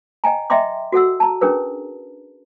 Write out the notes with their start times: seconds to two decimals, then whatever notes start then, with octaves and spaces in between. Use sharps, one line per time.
0.24 D#5 G5 G#5 A#5
0.50 D#5 E5 G5 A#5 C6 D6
0.92 F#4 A4 F#5 E6
1.20 A5 A#5
1.41 C#4 D4 G#4 A#4 B4